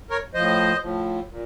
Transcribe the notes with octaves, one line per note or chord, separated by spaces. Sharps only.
A#4 C#5
A2 F3 C5 D#5
A2 F3
A#2